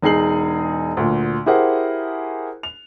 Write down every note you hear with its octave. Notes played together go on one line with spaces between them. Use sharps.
E1 D#4 G#4 C7 F#7
D2 A#2
E4 G4 G#4 A#4 C5 F#5
F7